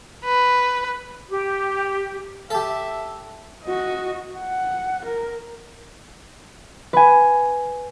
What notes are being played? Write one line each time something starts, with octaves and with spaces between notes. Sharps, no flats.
B4
G4
G4 A4 E5
F#4 D#5
F#5
A#4
B4 G#5